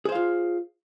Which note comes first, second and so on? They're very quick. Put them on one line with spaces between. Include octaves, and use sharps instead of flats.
G#4 C5 F5 F4